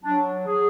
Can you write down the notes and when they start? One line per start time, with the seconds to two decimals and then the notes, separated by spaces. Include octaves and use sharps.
0.02 F#3 D4
0.46 F#3 G#4